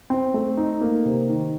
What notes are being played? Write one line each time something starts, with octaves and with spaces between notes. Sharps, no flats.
C4
A3
D#4
A#3
C3
D#3